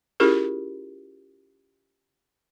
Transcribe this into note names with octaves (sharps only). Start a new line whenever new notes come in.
C#4 E4 F4 G4 G#4 A#4